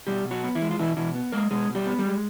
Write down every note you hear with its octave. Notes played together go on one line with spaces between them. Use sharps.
B2 G3 G4
B2
F#3 F#4
B3
E3 E4
G#3
F4
B2 E3 E4
B2 E3 E4
B3
G#3 A#3 A#4
B2 G#3 G#4
B2
G3 G4
B3
G3 G4
G#3